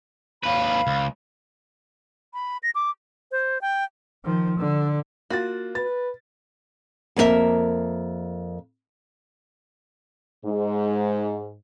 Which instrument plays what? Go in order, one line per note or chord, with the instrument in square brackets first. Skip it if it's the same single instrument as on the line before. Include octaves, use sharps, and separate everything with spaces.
[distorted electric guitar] D#2 B4 [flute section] F5 B5
[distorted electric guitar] C#2
[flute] B5
A#6
D6
[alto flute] C5
G5
[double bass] D#3 F3
D3
[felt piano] A#3 F4 A6 [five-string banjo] F#4
[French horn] B4 [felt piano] A6
[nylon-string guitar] F2 A#3 B3 A#4 E5
[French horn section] G#2